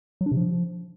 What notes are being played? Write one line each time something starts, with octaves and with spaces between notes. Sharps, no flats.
F#3
D4
C3
F3